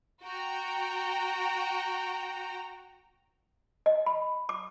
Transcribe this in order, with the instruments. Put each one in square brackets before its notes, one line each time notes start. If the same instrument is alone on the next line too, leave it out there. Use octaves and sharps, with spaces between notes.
[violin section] F#4 G5 A#5
[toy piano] D#5
B5
D6